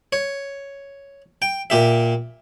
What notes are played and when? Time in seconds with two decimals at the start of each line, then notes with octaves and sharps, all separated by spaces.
0.13 C#5
1.42 G5
1.70 A#2 G4 E5